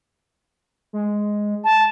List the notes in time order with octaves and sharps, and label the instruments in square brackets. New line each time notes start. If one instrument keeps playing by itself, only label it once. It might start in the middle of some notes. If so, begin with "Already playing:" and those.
[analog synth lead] G#3
[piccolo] A5